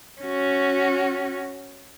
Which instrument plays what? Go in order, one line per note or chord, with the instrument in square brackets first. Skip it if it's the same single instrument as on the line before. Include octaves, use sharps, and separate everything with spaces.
[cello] C#4 F#4